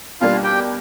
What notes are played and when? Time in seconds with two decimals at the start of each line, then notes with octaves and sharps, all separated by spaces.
0.21 B2 G3 A#3 D4 F4 F5
0.44 G4 G5